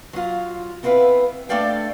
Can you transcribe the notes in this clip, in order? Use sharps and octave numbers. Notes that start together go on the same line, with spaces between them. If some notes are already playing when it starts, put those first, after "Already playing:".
F#3 F4
B3 C4 E4 B4 F5
A3 D4 A4 D5 F5 G5